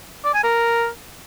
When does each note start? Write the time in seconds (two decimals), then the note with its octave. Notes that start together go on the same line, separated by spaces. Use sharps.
0.24 D5
0.34 G#5
0.44 A#4